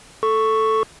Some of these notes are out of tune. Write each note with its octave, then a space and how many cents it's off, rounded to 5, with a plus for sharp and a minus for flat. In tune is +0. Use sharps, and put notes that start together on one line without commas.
A4 +0 C#6 +0